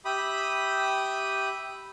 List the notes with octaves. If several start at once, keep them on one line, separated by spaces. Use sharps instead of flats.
G4 E5 B5 D#6